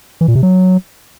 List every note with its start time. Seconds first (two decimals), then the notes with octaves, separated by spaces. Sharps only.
0.21 E3
0.28 A#2
0.35 C3
0.43 F#3